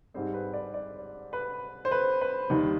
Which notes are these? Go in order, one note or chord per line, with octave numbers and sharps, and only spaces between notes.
G#2 G3 C4 C5
B4
D5
D5
B4
C5
B4
B4
D#2 D#3 G3